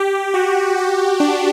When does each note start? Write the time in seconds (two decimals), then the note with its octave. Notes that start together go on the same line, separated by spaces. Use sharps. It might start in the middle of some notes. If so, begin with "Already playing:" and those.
Already playing: G4
0.34 F#4
0.77 F#4
1.20 D4